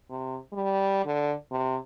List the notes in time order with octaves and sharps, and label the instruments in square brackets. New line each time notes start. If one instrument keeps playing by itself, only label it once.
[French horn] C3
G3
D3
C3